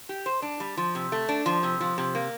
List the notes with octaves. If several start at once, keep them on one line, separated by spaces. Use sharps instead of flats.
G4
C5
D4
G3
F3
C3
A3
D4
F3
C3
F3
C3
A#3